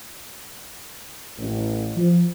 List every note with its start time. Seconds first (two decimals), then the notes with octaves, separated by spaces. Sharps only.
1.38 A1
1.97 F3